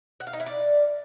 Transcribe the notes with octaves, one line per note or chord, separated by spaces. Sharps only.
F#5
F5
D#4
E4
D5